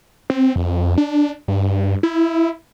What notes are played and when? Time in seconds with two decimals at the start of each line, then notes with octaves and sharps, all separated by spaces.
0.30 C4
0.56 F2
0.98 D4
1.48 G2
2.03 E4